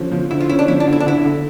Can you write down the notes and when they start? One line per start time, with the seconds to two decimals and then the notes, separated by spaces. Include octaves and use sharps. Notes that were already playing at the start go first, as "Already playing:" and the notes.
Already playing: D3 F3 C#4
0.12 F3
0.31 D3 E4
0.40 F4
0.49 C#4 E4
0.59 D4
0.68 F3 E4
0.80 D4
0.87 D3
0.93 E4
1.00 D4
1.06 D3 E4
1.25 D3